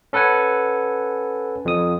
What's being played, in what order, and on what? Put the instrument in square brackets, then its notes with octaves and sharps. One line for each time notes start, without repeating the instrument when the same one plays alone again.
[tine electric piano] C#4 A4 B4 F#5 G#5
F2 D#6